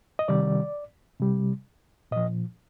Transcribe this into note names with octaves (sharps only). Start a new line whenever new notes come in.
D#5
C3 D#3 G3 D5
C3 G3
A#2 F3 D#5